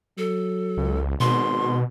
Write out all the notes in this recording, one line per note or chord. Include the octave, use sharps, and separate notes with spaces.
F#3 A4
C#2
G#1 B2 C6